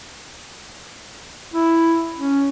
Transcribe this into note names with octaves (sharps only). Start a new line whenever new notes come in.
E4
C#4